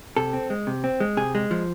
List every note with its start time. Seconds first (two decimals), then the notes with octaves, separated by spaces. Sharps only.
0.17 C3 A4
0.33 C4
0.50 G#3
0.67 C3
0.84 C4
1.00 G#3
1.17 C3 G#4
1.35 G#3
1.51 F3